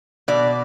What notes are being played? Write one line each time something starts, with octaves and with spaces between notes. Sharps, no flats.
B2 D5